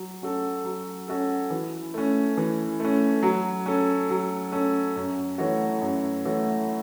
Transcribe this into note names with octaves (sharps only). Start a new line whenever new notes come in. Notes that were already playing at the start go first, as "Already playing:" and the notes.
Already playing: F#3
C#4 F#4 A4
F#3
C#4 F#4 A4
E3
A3 C#4
E3
A3 C#4
F#3
C#4 A4
F#3
C#4 A4
F#2
E3 A3 F#4 C#5
F#2
E3 A3 F#4 C#5